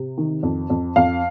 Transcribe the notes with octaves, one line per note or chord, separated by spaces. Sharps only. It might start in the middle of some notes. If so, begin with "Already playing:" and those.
Already playing: C3
D#3
F2
F2
F2 F5